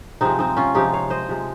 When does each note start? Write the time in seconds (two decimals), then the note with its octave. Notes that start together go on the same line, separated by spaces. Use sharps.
0.21 C3 F3 G#3 C4 D#4
0.39 C4 D#4
0.57 C#4 F4
0.75 C3 F3 G#3 D#4 G4
0.93 C#5 F5
1.10 C5 D#5
1.29 C3 F3 G#3